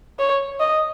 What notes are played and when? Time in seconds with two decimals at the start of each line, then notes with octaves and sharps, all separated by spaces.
0.19 C#5
0.60 D#5